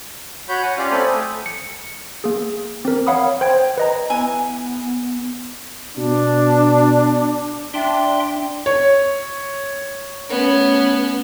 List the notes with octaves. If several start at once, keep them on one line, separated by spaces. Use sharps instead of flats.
F#4 C#5 B5 G6
F#5 G#5
C#4 F4 G4 D5 F5 F6
A3 C4 A4 G5 G#5 B5
A3 D#6
C#7
A#3 G#4
C4 A#4
C#5 F5 F#5 B5 D#6
C5 G5 G#6
B4 D#5 A#5
E3 B3 G#5
B2 D4
D4 E5 G5 C6
C#5
A3 B3 C#4